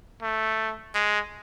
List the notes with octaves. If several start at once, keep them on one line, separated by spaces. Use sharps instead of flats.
A3
G#3